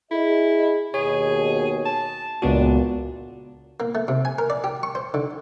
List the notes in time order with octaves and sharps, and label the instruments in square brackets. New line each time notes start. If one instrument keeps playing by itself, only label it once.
[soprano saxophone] E4 [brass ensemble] G#4 D#5
[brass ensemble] D#2 B2 [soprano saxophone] G#4 [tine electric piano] C#5
[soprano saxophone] A5
[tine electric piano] C#2 B3 F#4 [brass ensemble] A#2 [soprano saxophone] D4
[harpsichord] A#3
A3
C3
G#5
A#4
D5
G4
C#6
C5
D3